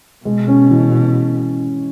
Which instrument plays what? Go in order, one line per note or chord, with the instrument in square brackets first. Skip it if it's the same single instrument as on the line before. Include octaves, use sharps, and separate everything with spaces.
[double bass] B2 [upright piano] G#3
[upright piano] C#4
E3